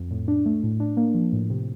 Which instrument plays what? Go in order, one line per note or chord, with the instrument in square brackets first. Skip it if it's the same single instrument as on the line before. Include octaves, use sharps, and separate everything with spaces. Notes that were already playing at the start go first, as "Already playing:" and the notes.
Already playing: [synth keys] F2
A2
D4
A3
A2
D4
A#3
F3
A2
C3